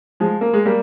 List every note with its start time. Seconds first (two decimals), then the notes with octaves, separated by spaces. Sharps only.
0.20 F3 G#3
0.41 A#3
0.53 G#3
0.66 G3 A#3